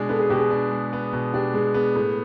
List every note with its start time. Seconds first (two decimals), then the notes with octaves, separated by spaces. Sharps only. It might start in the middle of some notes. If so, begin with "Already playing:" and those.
Already playing: B2 G#3 D4
0.09 B3 A4
0.19 G#4
0.30 B2 G4
0.39 G#4
0.51 D4
0.71 G#3
0.93 B3
1.13 B2
1.33 D4 G4
1.54 G#3 G#4
1.74 B3 G#4
1.95 A2 G#4